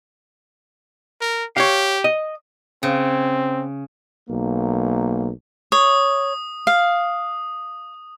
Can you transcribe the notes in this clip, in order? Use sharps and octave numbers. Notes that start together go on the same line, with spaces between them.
A#4
G4 C#5 F5
D#5
C#3 C4
B1 A#3
C#5 D#6
F5